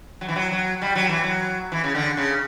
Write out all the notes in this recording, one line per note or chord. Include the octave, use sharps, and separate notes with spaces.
F#3
E3
F#3
F#3
G3
F#3
E3
F#3
E3
C#3
D3
C#3